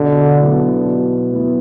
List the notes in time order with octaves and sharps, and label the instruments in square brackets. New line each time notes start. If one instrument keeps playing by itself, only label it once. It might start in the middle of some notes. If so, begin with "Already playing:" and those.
Already playing: [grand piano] B2 [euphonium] D3
[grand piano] F#3 B3 E4
B2
F#3 B3 E4